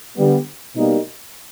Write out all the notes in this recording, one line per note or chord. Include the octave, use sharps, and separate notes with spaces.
D3 G3 B3
B2 G3 A#3 D#4